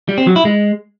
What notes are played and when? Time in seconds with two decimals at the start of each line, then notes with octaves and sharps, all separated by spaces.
0.09 G3
0.18 C4
0.27 F#3
0.36 E4
0.45 G#3